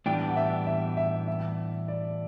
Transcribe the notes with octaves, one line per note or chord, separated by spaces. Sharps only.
A2 E3 G3 B3 D4 G5
F#5
E5
E5
E5
E5
D5